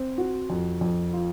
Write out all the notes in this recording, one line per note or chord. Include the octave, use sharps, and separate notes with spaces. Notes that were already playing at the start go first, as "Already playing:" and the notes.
Already playing: C4
F#4
F2
F2
F4